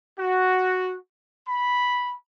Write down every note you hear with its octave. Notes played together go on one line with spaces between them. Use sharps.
F#4
B5